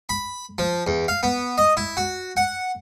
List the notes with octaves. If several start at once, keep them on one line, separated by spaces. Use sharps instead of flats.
B5
F3
E2
F5
B3
D#5
E4
F#4
F#5